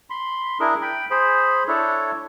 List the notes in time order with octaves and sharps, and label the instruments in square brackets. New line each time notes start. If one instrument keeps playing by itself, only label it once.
[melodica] B5 C6
D4 E4 G#4 A#4
G5 B5
G#4 C5 B5
D4 E4 A4 C#5